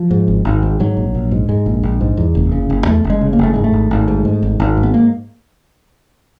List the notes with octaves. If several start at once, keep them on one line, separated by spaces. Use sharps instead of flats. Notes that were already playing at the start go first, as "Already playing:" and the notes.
Already playing: F3
G#2
G#1
G#1
G#2
G#2 F#3
A#1
A#1
G#2
G#2 G#3
A#1
A#1
G#2
E2
F#1
C#3
F#1
E2 A3
F#1
G#3
C#3
A#3
F#1 A3
G#2 G#3
A3
G#1
G#1
G#2
G#2
G#1
G#1
G#2
B3
A#3